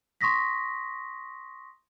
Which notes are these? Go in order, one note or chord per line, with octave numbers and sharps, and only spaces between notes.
C6 C#6 D#6 A#6 B6